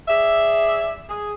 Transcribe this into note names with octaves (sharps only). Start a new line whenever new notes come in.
G#4 D5 E5
G#4